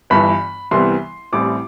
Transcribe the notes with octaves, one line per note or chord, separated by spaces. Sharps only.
G1 G2 E3 B5
C2 C3 E3 G3 B3 C6
A1 A2 G3 C4 D6